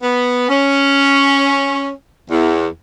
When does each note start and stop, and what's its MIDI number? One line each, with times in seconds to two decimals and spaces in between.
0.01 0.49 59
0.49 1.89 61
2.30 2.66 40